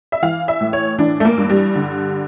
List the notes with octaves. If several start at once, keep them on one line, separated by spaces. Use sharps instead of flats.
E5
E3 F5
E5
A2
C#5
E3 D4
A3
A#3
G2
G3
D3